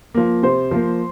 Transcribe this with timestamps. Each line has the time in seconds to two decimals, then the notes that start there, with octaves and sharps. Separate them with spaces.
0.14 F3 A#3
0.43 C3 C5
0.71 F3 A#3